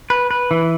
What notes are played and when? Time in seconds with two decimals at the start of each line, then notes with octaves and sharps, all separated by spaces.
0.10 B4
0.31 B4
0.51 E3